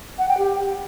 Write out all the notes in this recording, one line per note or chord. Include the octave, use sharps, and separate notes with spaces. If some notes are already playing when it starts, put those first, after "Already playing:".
F#5
G5
G4